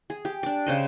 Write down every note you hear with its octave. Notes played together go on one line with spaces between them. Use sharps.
G#4
G4
D4 D6
C#3 C5 D#5